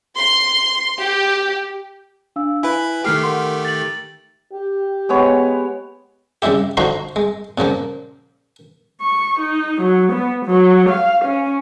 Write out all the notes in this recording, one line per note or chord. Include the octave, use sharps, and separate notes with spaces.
C6
G4
D4 F5 E6
E4 B4 G#5
D#3 A3 G4 G5 F6 C7
A#4 F#5 C6
A6 F#7
G4
G#3 B3 C#5
C#3 G3 G#3 E4 G4
D3 F3 D#4 F#4 A#5 C6
G#3
A#2 C#3 F3 A#3
C#6
D#4
F#3
B3
F#3
F5
C#4